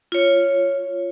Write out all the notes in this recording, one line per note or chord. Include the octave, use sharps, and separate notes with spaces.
F4 C#5